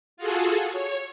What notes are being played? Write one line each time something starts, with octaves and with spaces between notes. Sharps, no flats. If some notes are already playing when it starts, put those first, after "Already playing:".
F4 F#4 G#4 A4
C#5